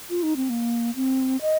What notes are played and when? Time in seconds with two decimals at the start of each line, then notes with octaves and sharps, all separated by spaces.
0.10 F4
0.23 D#4
0.36 C4
0.50 A#3
0.96 C4
1.41 D#5